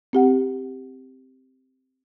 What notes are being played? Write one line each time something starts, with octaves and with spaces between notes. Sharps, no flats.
C4 G4 F#5